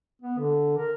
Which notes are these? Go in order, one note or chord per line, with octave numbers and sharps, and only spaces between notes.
B3
D3
A#4